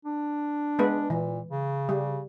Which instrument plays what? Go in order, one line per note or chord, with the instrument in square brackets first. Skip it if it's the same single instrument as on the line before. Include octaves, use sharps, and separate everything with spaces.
[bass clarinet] D4
[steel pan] G#3 B3 B4
[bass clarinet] A#2 [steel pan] E3
[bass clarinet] C#3
[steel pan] G3